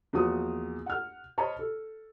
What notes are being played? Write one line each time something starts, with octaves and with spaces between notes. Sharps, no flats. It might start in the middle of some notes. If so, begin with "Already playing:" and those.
E2 F3 A#3 F#4 D#6
F#5 F6
C5 C#5 D#5 A5 B5
A4